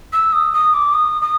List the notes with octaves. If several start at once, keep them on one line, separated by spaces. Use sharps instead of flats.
E6
D#6
D#6
D6
D#6
D#6